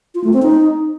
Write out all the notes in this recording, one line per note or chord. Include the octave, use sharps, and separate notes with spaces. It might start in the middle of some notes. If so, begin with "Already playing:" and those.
F4
A3
C4
D#4